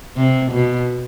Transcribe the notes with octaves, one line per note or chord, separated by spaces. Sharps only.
C3
B2